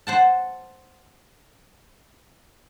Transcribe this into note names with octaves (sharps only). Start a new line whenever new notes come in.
C5 F#5 A5